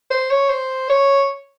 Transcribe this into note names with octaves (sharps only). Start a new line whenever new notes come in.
C5
C#5
C5
C#5